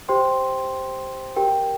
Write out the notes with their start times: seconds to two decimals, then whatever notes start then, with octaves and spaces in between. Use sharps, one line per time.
0.09 G4 C5 G5 C6
1.36 G4 A#4 G5